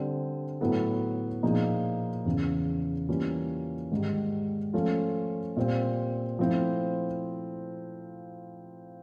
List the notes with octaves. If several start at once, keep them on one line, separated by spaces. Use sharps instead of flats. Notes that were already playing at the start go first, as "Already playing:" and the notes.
Already playing: D3 G3 C4
A2 F#3 B3 E4 A4
A#2 F3 A#3 D#4 G#4
E2 C#3 E3
E3 G3 A#3 C#4 F4
G#2 D#3 G3
F3 A3 C#4 F4 A4
A#2 G3 C4
F3 A3 C4 E4